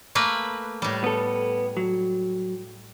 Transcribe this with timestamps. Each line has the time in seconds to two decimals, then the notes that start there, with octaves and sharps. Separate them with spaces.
0.15 A3 A#3 B4
0.82 A2 G3
1.04 B3 A4
1.77 F#3